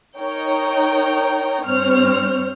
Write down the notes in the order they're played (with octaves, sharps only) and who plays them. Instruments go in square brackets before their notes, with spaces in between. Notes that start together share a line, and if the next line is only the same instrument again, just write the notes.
[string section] D#4 A#4 C#5 G5
G2 C4 C5 C#5 F6